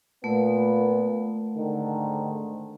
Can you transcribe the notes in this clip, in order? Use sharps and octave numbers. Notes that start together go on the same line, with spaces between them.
A#2 A3 B3
G#2 D3 D#3